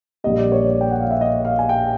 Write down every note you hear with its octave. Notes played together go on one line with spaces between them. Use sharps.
A#1 A#2 G3 D#5
D5
C#5
D5
G5
F#5
F5
E5
D#5
F5
G#5
G5